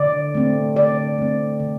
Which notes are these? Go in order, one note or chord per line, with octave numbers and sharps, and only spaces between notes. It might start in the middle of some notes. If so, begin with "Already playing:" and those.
Already playing: D3 D5
A3 C4
D3 D5
A3 C4
D3